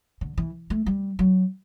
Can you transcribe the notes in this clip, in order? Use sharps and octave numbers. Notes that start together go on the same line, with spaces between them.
D3
E3
A3
G3
F#3